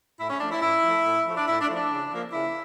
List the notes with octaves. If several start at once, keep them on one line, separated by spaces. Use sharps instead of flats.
A2 E4
C#4
F3 A3 D4
E4
A2 E4
F3 A3
A2
F3 A3
D4
A2 E4
D4
F3 A3
D4
C#3
F3 A#3
C#3 E4